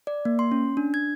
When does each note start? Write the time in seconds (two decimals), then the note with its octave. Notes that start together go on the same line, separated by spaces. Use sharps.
0.07 D5
0.25 A#3
0.39 C6
0.52 C#4
0.77 D4
0.94 G#6